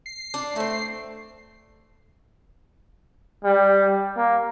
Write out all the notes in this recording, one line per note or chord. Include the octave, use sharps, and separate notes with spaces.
C7
D4
A3 A#3 C4
G3
A#3